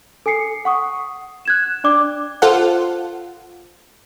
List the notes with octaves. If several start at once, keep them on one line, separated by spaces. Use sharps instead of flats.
A4 G#5 D#6 C7 C#7
F#5 C#6 D#6
F#6 G#6 E7
D4 D5 D6
F4 A4 C5 F5 F#5